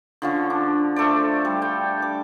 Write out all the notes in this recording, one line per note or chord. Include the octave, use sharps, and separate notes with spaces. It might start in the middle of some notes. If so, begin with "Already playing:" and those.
D3 F3 C#4
D4
A3 A4 C5 D5
G3
G5
D6